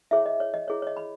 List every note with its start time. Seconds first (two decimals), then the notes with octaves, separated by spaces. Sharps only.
0.11 E4 G#4 C#5 E5
0.26 D#5
0.40 C#5
0.54 D#5
0.68 E4 G#4 C#5
0.82 C#5
0.87 D#5
0.97 B5